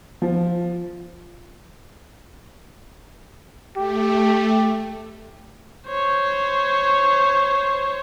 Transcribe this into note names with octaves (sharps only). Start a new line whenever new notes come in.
F3
A3 G4
C5 C#5